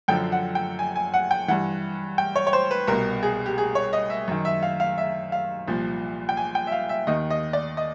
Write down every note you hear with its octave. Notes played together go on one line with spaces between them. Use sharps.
F#2 D3 F3 G5
F#5
G5
G#5
G#5
F#5
G5
G2 E3 F#5
G5
C#5
C#5
C5
B4
C2 B2 A#4
G#4
G4
G#4
C#5
D#5
E5
F#2 D#3
E5
F5
F5
E5
F5
C2 A#2 F3
G5
G#5
G5
E5
F5
E5
D#2 D#3 D#5
D#5
D5
D#5